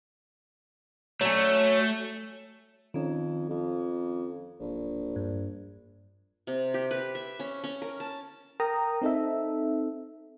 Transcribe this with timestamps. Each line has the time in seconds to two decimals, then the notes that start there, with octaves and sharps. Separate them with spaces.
1.21 F#3 A3 C#4
2.94 F2 D#3 C#4
3.50 F2
4.60 D1 A#1
5.16 G2
6.47 C3
6.74 G4
6.91 B4
7.15 E5
7.40 C#4
7.64 C#4
7.82 A#4
8.00 A5
8.60 A#4 G5 A#5 D#6
9.02 C4 D#4 A4 E5